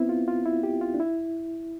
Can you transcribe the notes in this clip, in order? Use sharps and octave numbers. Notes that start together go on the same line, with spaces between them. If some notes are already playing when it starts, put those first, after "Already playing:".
Already playing: B3 C4 E4
F4
F4
E4
G4
F4
D4
E4